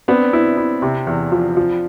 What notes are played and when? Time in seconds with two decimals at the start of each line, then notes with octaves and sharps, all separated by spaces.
0.08 B3 C4 D4
0.33 E4
0.57 E4
0.82 C3
1.07 E2
1.32 F3
1.57 F3